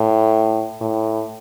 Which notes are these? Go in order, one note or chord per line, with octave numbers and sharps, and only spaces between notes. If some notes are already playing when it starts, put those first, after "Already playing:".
Already playing: A2
A2